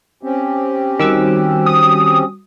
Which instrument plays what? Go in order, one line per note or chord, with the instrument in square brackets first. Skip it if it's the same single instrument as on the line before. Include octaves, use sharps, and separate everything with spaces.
[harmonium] C4 C#4 G4
[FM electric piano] D#3 D6 E6 [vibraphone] G3 F#4
[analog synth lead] D#6